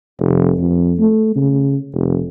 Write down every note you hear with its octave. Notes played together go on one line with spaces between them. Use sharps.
F1
F2
A3
C#3
F1